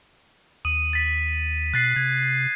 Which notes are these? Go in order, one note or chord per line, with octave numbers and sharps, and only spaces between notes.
D#2 D#6 D#7
A6 B6
B2 F#6 A6 C7
C3 G#6